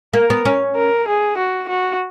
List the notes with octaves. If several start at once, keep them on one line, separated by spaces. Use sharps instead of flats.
A#3 A#4
B3
C#4
A#4
G#4
F#4
F#4